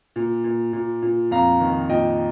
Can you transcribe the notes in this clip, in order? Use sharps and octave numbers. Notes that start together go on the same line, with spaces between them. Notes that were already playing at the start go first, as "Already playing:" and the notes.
A#2
A#2
A#2
A#2
F2 F5 A#5
D#3
A#2 D#5 G5